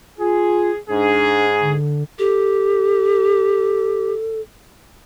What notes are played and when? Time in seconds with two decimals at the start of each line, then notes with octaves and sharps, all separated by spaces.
0.19 F4 G#4
0.89 G#2 D4 G#4
1.61 D3
2.19 G4 A4